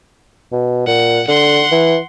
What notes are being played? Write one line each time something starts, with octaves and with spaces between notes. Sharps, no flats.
B2
A#2 F#5
D3 F#5 C6
E3